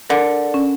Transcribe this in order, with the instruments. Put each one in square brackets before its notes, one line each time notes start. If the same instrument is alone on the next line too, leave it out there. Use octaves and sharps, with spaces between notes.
[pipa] D3 [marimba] A#4
[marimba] C#4